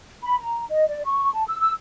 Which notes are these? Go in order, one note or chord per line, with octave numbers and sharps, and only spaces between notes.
B5
A#5
D#5
D5
C#6
A5
E6
E6